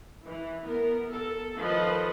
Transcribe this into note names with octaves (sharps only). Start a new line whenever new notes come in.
E3
B3 A#4
A4
D#3 F3 A4 B4 D#5